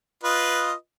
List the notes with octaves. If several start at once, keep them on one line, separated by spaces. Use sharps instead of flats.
F4 B4 D#5